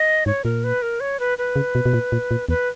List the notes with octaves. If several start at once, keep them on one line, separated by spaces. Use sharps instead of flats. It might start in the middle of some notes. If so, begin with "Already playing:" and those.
Already playing: D#5
G#2 C#5
A#2 A#4
B4
A#4
C#5
B4
B4
C#3
B2
B2
A#2
A#2
A#2
E2 B4